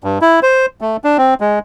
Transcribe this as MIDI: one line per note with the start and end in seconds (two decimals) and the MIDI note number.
0.04 0.18 43
0.22 0.40 64
0.43 0.66 72
0.81 0.97 57
1.04 1.17 62
1.18 1.34 60
1.41 1.59 56